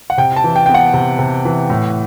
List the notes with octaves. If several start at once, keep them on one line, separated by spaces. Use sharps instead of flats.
F#5
C3 G5
A5
E3
G5
B3 G5
F#5
C3
C3
E3
A2